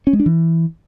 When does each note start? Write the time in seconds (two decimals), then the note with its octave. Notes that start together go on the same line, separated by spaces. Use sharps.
0.07 C#4
0.13 G#3
0.20 D4
0.26 E3